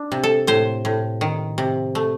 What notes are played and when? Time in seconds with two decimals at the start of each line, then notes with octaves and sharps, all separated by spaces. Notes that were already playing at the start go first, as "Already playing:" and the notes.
Already playing: D4
0.12 C3
0.23 A4
0.47 A2 C5
0.85 A2
1.21 D#3
1.58 C3
1.95 A3